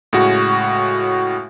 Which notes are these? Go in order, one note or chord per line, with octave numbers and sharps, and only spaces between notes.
A2 C#3 G#3 F#4